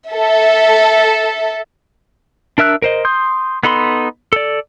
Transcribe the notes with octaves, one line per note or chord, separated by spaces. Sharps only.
A4 E5
D4 A#4 E5 E6 F#6
A#4 C5 D#5
C6 D#6 G6
B3 D#4 A4 B5 C6
A4 D5